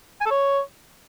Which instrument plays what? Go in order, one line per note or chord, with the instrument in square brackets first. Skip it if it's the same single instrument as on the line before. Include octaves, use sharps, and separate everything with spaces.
[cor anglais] G#5
A4
C#5